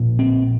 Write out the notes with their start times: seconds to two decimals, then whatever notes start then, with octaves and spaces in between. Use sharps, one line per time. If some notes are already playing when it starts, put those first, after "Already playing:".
Already playing: A#1 A#2
0.19 C4